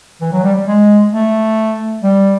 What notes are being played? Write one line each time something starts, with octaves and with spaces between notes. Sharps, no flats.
E3
F#3
G3
G3
G#3
A3
G3